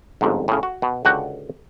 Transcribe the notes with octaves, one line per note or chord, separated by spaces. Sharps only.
G1 F2 G#2
A2 C#3
F#4
B2
C#2 D3 F#4 F#5 G5